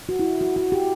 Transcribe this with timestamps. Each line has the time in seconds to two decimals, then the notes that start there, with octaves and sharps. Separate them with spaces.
0.09 F#4
0.19 E4
0.41 F#4
0.56 F#4
0.72 G4